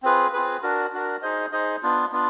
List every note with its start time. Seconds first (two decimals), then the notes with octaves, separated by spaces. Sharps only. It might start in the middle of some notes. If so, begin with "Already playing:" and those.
0.03 C4 F4 G#4 B4
0.33 C4 F4 G#4 B4
0.63 D4 F#4 A#4
0.93 D4 F#4 A#4
1.22 D#4 G#4 C5 D#5
1.52 D#4 G#4 C5 D#5
1.82 B3 D4 F4
2.12 B3 D4 F4